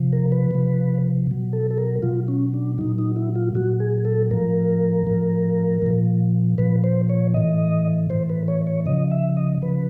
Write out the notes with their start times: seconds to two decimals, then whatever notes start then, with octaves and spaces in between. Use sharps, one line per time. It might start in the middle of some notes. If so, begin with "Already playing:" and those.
Already playing: C3 F3
0.13 A#4
0.32 B4
0.51 C3 F3
1.27 B2 F#3
1.53 A4
1.71 A4
1.78 A#4
2.02 B2 F#3 F4
2.28 C#4
2.54 D4
2.78 A#2 F#3 D#4
2.98 D#4
3.16 E4
3.35 F4
3.55 A#2 F#3 F#4
3.80 G#4
4.05 A4
4.31 A2 F3 A#4
5.07 A2 F3
5.82 A#2 F3
6.58 A#2 F3 B4
6.84 C5
7.09 C#5
7.34 A2 E3 D#5
8.10 A2 E3 C5
8.30 B4
8.48 C#5
8.67 C#5
8.86 C#3 F3 D#5
9.11 E5
9.37 D#5
9.62 C#3 F3 B4